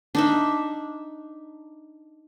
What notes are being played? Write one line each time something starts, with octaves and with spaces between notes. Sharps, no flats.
D4 D#4 E5